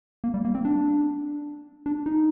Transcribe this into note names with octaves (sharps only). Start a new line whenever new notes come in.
A#3
G3
A#3
C4
D4
D4
D#4